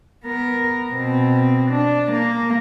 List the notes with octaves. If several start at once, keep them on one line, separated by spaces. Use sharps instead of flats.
B3 A#4
B2 C4
D4
A#3